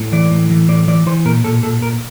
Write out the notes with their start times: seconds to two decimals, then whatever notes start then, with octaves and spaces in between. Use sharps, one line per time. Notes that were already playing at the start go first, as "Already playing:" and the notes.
Already playing: A2
0.12 E3 D5
0.31 A2
0.50 E3
0.68 A2 D5
0.88 E3 D5
1.06 E3 C5
1.25 A#2 A#4
1.44 A#2 A4
1.63 A#2 A4
1.82 A#2 A#4